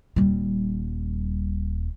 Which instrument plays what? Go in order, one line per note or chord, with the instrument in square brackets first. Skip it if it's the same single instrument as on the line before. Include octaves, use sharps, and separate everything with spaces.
[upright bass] D#1 G3